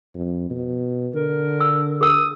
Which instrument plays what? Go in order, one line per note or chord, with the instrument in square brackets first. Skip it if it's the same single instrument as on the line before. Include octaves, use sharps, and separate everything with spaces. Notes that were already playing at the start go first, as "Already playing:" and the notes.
[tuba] F2
B2
[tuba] D3 [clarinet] A#4
[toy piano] E6
[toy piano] G#4 A#4 E6 [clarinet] D#6